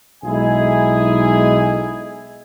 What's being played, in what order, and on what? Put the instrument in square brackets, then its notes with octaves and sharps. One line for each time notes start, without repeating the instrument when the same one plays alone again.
[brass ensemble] B1 G#3 D#4 E4 G#4 G#5